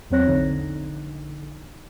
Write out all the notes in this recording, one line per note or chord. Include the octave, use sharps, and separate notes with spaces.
E2 F#3 C4 C#5 F#6 A#6
A#1 D3 D#4